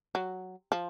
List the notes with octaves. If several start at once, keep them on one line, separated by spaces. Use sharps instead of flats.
F#3
F3